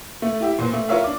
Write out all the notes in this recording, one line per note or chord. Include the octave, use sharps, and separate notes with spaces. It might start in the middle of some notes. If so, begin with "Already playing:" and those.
A3
E4 G4 E5
A#2 B4 C5
A3
F4 A#4 B4 C#5 E5 F5
D4 D6